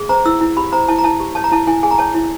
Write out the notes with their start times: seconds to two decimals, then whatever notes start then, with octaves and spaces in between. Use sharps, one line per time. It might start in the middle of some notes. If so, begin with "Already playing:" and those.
Already playing: G#4
0.09 C5 A#5
0.25 E4 E6
0.41 E4
0.57 G4 B5
0.72 C5 A#5
0.88 E4 A5
0.99 A#5
1.04 E4 A5
1.20 G4
1.35 C#5 A5
1.44 A#5
1.52 E4 A5
1.67 E4 G#5
1.83 G#4 G#5
1.91 A#5
1.98 C#5 A5
2.15 E4